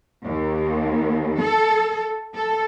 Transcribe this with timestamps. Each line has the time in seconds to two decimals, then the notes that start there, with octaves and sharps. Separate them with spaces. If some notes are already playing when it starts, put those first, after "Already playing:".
0.24 D#2
1.41 A4
2.35 A4